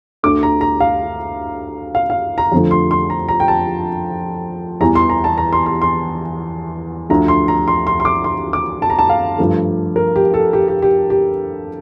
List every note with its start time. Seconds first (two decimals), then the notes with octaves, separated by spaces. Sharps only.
0.23 D2 D3 A3 D6
0.43 A#5
0.61 A#5
0.80 F5
1.95 F5
2.10 F5
2.38 A#5
2.52 F2 D3 F3 A3
2.71 C6
2.91 C6
3.10 A#5
3.29 A#5
3.40 G5
3.48 A5
4.80 E2 E3 G3 A#5
4.95 C6
5.10 A#5
5.24 A5
5.38 A#5
5.53 C6
5.66 C6
5.82 C6
7.10 D2 D3 F3 A3 A#5
7.28 C6
7.48 A#5
7.68 C6
7.87 C6
8.00 C6
8.05 D6
8.24 C6
8.53 D6
8.82 A5
8.90 A#5
8.99 A5
9.10 F5
9.38 G2 F3 A3
9.96 A#4
10.16 G4
10.34 A4
10.53 G4
10.68 G4
10.82 G4
11.10 G4